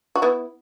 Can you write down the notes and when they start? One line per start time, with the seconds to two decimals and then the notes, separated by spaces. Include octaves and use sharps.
0.15 F#4
0.22 B3 E4